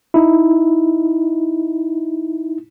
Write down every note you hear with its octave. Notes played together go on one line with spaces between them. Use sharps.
D#4 E4